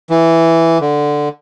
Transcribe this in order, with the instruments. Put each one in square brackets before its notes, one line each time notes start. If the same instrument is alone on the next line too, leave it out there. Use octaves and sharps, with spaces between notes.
[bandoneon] E3
D3